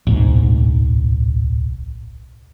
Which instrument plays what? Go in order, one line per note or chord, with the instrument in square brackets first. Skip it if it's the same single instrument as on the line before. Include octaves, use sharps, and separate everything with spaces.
[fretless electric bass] D1 B1 G#2